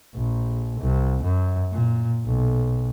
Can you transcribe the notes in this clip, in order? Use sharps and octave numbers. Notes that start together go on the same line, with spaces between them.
A#1
C2
F#2
A#2
B1